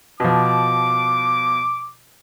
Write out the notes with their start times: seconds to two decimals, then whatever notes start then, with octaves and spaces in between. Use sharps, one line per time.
0.20 B2 F3 D6